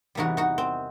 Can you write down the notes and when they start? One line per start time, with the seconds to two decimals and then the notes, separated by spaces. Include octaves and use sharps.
0.15 E2 C3 E3 G3 D#4 F#4
0.37 D#4 F#4
0.58 C4